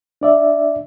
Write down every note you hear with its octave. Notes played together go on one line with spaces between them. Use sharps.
D4 D5 E5